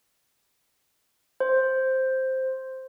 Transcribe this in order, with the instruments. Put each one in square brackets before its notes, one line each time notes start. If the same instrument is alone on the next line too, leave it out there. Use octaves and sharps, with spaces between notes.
[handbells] C5